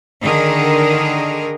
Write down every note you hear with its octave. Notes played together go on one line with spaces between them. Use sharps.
D3 D#3 G#4 A#4